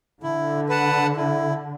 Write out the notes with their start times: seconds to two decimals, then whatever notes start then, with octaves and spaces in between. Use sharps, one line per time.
0.22 D3 E4
0.69 B4 F#5 A5
1.16 E4